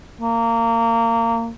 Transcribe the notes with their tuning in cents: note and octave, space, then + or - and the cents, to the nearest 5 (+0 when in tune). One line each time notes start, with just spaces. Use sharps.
A#3 -25